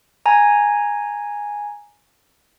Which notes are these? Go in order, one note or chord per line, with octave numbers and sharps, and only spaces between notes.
G#5 A#5